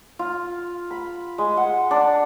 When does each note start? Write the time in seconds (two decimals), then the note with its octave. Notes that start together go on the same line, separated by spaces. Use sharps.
0.19 F4
0.91 B5
1.38 G#3
1.57 F#5
1.91 D4